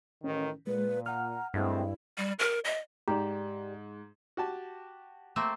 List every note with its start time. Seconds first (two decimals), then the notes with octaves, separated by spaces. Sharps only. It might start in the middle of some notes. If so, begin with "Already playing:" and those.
0.24 A1 D#3 C#4
0.67 A#2 G#3 B4
1.06 F#5 A#5 F6
1.54 G2 G#3 A3 C4 E4
2.18 G3
2.39 A#4
2.65 D#5
3.08 G#2 G4 D5 A#5
4.37 F#4 G4 A5
5.36 A3 A#3 C4